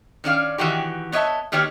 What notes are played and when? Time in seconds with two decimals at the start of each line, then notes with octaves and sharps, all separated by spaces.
0.24 D#3 C#4 D5 F5
0.58 B2 D#3 E3 F#4 G4
1.12 B3 C#5 D#5 E5 A5
1.52 B2 D#3 A#3 G4 C#5